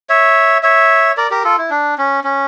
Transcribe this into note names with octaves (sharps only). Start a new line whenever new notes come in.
C#5 E5
C#5 E5
A#4 D5
G4 A#4
F4 A4
E4
D4
C#4
C#4